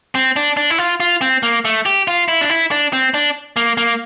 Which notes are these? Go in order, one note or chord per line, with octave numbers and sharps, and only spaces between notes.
C4
D4
D4
E4
F4
F4
C4
A#3
A3
G4
F4
E4
D4
E4
D4
C4
D4
A#3
A#3